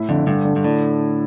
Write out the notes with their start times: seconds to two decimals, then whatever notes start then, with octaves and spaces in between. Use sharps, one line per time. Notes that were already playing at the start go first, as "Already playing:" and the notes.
Already playing: A2 E4
0.09 F2 D3
0.27 G2 D3
0.45 D3
0.56 G2
0.64 A2 D4